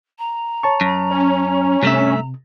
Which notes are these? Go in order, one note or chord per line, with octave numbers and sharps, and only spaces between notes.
A#5
C#5 A5 C#6
F#2
C#4
G2 C3 A3 E5